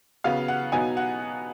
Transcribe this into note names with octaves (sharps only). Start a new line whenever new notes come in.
C#3 F#3 B3 F5
F#5
B2 F#3 B3 D#4 G#5
F#5